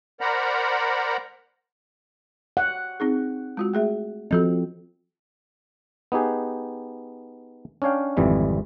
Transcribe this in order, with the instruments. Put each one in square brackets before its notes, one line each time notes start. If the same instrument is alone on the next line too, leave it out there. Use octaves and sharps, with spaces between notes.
[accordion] A#4 C5 D5 F#5 A#5 B5
[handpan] F#5
[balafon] C4 D#4 G#4
G#3 F4 F#4
A3 G#4 E5
[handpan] F3 C4 [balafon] F#4 A4 D#5
[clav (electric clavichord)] B3 D#4 G4 G#4 B4
C#4 D4 C#5 F5 G5
G#1 F2 C3 E3 G3